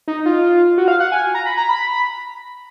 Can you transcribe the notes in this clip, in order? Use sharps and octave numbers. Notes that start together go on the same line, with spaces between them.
D#4
F4
F#4
F5
F#5
G#5
A#5
B5
A#5
B5